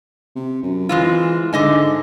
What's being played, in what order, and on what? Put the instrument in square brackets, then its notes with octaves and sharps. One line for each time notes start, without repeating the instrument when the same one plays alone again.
[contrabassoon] C3
F#2
[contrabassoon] E3 [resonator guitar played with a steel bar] G#3 C4 F4
[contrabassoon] G#2 [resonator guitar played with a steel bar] D3 D#5 G#5